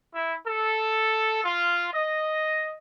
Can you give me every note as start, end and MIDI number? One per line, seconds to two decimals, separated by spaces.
0.14 0.34 64
0.47 1.42 69
1.45 1.89 65
1.94 2.77 75